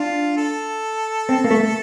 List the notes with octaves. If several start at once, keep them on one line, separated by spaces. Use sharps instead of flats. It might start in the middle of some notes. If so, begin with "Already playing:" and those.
Already playing: D4 F4
A4
C4
A#3
A3